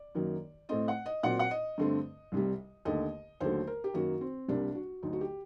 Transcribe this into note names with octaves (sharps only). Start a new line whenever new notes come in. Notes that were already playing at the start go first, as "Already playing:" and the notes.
Already playing: D5
F#2 D#3 F#3 A#3
A2 A3 C4 D#5
F#5
D#5
A#2 F#3 C4 F#5
F#5
D#5
G2 D3 A3 C4
C2 C3 G3
D#2 D3 A3 D#5
D#2 D3 F#3 A3 C5
A#4
G4
F#2 D#3 F#3 A#3 F#4
C4
C2 C3 G3 A#3 D4
F#4
D2 D3 F#3 D#4
F#4
G4